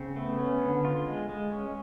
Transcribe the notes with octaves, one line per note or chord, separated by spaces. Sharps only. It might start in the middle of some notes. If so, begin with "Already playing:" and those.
Already playing: C#3 C4
A3 B3
C#4
D3
F4
G#3
G#3
C#4